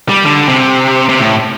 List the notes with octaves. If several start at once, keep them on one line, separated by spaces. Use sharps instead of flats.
G3
D3
C3
C3
A2